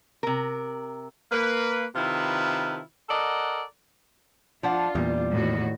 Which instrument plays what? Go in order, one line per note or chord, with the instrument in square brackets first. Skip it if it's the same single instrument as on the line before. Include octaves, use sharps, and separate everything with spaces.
[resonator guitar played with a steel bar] C3 A#4
[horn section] A#3 B4
C3 D#3 E4 F4 B4 A5
A4 A#4 D5 D#5 F#5
[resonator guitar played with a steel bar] F3 D4 F#5 [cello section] F4
[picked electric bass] E2 A#2 [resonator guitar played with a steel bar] G3
[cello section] A2 D#3 F#4